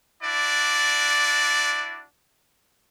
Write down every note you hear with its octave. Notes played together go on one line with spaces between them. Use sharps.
D4 E4 F#4 D5